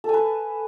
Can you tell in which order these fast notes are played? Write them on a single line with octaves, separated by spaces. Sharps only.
A4 G#5 B4